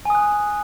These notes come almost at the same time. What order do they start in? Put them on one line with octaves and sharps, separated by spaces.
G#5 D#6 F#6